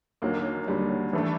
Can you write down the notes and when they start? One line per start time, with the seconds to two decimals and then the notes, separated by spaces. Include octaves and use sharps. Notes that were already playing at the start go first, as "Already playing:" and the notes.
0.22 D#2 D3 F#3 A#3
0.37 A#3
0.68 D#2 D3 F#3 G3
1.13 E3 A3 D4